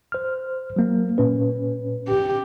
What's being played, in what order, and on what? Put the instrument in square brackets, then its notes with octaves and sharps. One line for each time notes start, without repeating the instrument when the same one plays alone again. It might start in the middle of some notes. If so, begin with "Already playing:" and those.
[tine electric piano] C5 F6
F#3 A#3
A#2 C#4 B4
[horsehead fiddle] G4